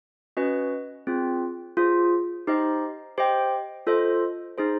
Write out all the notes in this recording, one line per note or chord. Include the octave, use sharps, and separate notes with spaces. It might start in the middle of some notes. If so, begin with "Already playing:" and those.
C#4 F#4 B4 D#5
C4 F4 G#4
F4 G#4 C5
D#4 G4 C5 D#5
G4 C5 D#5 G5
F4 A4 C5 D#5
D#4 G#4 C5